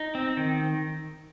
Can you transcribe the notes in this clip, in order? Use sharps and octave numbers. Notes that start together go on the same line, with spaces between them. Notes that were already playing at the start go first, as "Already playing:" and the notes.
Already playing: D#4
C4
D#3